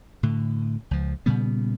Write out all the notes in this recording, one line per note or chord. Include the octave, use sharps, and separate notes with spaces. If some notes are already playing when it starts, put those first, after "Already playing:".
A2 D3
C#2 F3
A#2 C#3 G3 B3